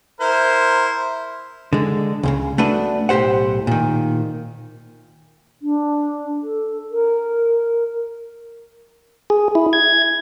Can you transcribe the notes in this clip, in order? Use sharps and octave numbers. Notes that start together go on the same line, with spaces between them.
E4 A#4 C5
D3 G#3
C#2 A#2 C#3
A3 B3 D4 F#4 B4
B1 A2 G4 C5 F#5
A#2 D#3
D4
A4
A#4
G#4
E4
G#6